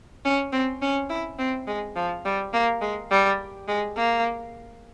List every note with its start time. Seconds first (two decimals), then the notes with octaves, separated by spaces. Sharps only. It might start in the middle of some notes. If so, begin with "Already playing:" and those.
0.25 C#4
0.52 C4
0.82 C#4
1.10 E4
1.39 C4
1.68 G#3
1.96 F3
2.25 G3
2.53 A#3
2.81 G#3
3.11 G3
3.68 G#3
3.97 A#3